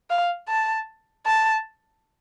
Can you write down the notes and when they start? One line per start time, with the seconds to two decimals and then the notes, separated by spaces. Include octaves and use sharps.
0.10 F5
0.48 A5
1.26 A5